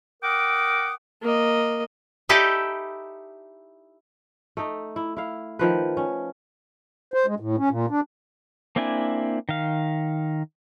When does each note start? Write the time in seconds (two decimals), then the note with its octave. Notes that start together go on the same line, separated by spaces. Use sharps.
0.23 A#4 F#5 G5 D6 D#6
1.22 A#3 D#5
2.29 D#4 E4 G4 A4 D5 D#5
4.57 A3 D#4
4.96 E4
5.17 E4 F5
5.59 D#3 F3 B4
5.97 C#4
7.14 C5
7.26 G#3
7.40 A2
7.58 C#4
7.71 A#2
7.90 D4
8.76 A#3 C4 D4 E4 G#5
9.49 D#3 F5